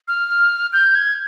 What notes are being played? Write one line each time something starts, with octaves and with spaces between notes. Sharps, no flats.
F6
G6
G#6